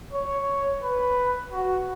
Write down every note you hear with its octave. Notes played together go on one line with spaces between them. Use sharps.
C#5
B4
F#4